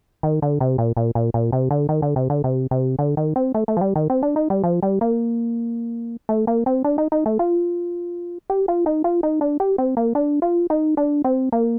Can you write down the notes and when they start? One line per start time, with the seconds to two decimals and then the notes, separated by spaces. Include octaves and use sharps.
0.23 D#3
0.42 D3
0.61 C3
0.78 A#2
0.97 A#2
1.15 A#2
1.34 A#2
1.52 C3
1.71 D3
1.89 D#3
2.02 D3
2.16 C3
2.30 D3
2.44 C3
2.71 C3
2.99 D3
3.17 D#3
3.36 C4
3.55 A3
3.68 A3
3.77 F3
3.81 G3
3.96 D#3
4.10 C4
4.23 D4
4.36 D#4
4.50 G3
4.64 F3
4.83 G3
5.01 A#3
6.29 A3
6.47 A#3
6.66 C4
6.84 D4
6.98 D#4
7.12 D#4
7.26 A3
7.39 F4
8.50 G4
8.68 F4
8.86 D#4
9.04 F4
9.23 D#4
9.41 D4
9.60 G4
9.78 C4
9.97 A#3
10.15 D4
10.42 F4
10.70 D#4
10.97 D4
11.25 C4
11.52 A#3